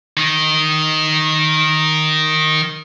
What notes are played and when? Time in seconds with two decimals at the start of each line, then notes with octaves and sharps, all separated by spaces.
0.17 D#3 D#4